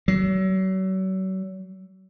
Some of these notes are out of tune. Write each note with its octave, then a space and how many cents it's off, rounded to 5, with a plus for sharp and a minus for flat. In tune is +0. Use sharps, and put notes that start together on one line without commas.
F#3 +35